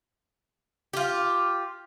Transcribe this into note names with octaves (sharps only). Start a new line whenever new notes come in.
F4 G4